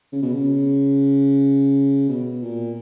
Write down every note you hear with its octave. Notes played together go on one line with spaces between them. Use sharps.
C#3
B2
C#3
B2
A#2